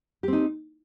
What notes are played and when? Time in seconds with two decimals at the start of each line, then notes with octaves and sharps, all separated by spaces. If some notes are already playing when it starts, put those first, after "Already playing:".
0.23 G4
0.28 C4
0.33 D#4